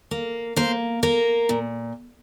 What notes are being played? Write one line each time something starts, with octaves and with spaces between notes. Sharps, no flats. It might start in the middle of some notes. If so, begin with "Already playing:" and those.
A#3
A#3 C5
A#3 A#4
A#2